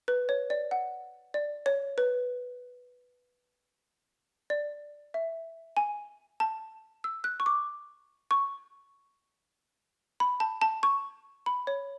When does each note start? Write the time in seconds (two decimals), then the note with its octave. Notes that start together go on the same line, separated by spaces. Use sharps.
0.08 B4
0.29 C#5
0.50 D5
0.71 F#5
1.34 D5
1.66 C#5
1.98 B4
4.50 D5
5.14 E5
5.77 G#5
6.40 A5
7.04 E6
7.24 F#6
7.40 C#6
7.46 D6
8.31 C#6
10.20 B5
10.40 A5
10.62 A5
10.83 C#6
11.46 B5
11.67 C#5